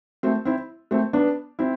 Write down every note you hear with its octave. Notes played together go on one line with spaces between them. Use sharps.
A3 C4
C4 E4
A3 C4
B3 D4
C4 E4